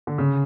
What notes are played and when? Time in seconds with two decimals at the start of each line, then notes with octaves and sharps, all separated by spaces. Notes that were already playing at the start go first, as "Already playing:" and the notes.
0.07 D3
0.18 C#3